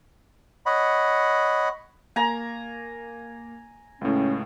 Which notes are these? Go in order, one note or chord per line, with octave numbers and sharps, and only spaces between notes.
C#5 D#5 F#5 B5
A#3 G#5 A#5
C#2 A2 C#4